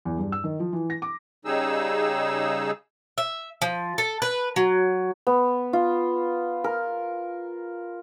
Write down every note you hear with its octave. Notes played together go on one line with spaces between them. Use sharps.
E2
G2
E6
D#3
F3
E3
A#6
D6
C#3 G3 D#4 G#4 E6
E5
F3
A4
B4
F#3
B3
F4
A#4